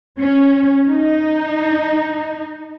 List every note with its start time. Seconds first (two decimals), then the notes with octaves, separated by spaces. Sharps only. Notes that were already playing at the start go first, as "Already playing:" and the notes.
0.18 C#4
0.88 D#4